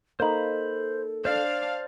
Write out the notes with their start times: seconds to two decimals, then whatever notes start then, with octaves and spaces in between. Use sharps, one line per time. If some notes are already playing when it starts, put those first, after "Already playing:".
0.20 A#3 D#4 A4 C5 B5
1.25 D4 C5 D5 F5